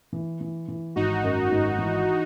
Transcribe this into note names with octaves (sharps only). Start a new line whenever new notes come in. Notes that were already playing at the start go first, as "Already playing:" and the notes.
E3
E3
E3
G#1 D#4 F#4
F#2
G#1
E3